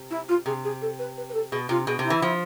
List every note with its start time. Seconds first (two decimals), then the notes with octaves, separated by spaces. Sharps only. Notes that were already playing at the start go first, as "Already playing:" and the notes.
Already playing: C3
0.10 E4
0.28 F4
0.46 C3 G#4
0.64 G#4
0.81 A4
0.99 B4
1.17 B4
1.29 B4
1.34 A4
1.51 B2 G#4
1.69 C3 F4
1.87 B2 G#4
1.99 C3
2.04 E4
2.10 E3
2.22 F3